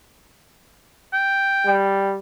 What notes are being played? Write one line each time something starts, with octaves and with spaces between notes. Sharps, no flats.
G5
G3